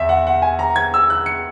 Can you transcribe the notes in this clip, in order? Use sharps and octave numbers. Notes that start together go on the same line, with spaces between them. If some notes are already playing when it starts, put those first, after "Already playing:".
Already playing: E2 E5
F#5
F#5
G#5
A#5
G#6
E6
F#6
C#7